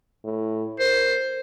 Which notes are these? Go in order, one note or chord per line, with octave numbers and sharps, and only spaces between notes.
A2
A#4 C5